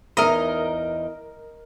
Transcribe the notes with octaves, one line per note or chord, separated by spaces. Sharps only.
E2 D#4 A#4 D#5 E5 A#5